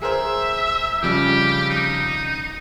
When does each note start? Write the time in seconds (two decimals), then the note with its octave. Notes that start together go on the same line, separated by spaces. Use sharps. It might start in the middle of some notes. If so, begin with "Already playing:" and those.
0.02 G#4 A#4 C5 E5
1.02 F2 C#3 G3 G4
1.70 D#4